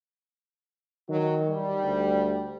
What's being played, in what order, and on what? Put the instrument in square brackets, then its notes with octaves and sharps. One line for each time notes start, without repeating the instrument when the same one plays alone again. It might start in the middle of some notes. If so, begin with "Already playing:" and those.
[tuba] D#3 [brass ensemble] F#3
[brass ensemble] G3
[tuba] D2